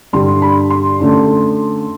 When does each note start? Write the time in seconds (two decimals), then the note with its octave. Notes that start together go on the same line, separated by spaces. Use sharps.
0.13 G2 D3 G3 C6
0.42 B5
0.70 C6
1.00 F#2 D3 A3